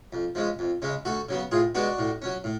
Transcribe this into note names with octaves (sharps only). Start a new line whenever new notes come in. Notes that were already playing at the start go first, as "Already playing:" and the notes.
F2
F3 G#3 C#4
F2
C#3 G#3 C#4
D2 F#4 A4
C#3 F#3 B3
A2 F4 G#4
G#3 B3 D4 F#4
A2
F#3 C#4
A2